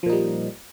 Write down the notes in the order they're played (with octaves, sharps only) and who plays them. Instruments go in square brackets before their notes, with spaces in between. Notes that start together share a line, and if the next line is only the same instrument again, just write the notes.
[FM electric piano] F3
A#2
D#4
G3